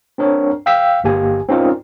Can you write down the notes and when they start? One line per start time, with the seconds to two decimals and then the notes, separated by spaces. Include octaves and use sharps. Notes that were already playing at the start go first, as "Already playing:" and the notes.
0.18 C4 D4 A#4 C#5
0.66 F5 G5 E6 B6
1.04 G1 A#3 G4 G#5
1.49 C4 C#4 D#4 F4 A#4 D5